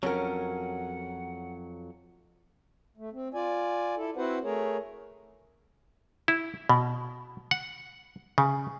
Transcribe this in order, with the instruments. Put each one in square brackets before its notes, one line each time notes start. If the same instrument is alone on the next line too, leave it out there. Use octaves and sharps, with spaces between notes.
[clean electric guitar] F2 F#3 [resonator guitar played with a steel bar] C#4 A#4 [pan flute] F#5
[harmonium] A3
C4
F4 D5 G#5
E4 A4
C4 E4 F#4 B4 C5 F#5
A3 G#4 A#4 C#5
[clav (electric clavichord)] E4
B2
F#5
C#3